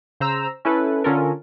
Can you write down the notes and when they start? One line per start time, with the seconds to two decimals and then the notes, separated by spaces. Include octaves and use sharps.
0.20 C#3 C5 A#5 E6
0.65 C#4 E4 A4 B4
1.04 D3 C#4 F4 A4 A#4